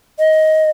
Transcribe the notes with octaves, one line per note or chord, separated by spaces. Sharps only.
D#5